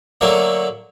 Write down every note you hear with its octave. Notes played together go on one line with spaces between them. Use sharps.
D3 F#3 A3 A#3